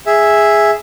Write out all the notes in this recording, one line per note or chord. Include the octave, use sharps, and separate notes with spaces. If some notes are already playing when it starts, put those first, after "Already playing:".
G#4 E5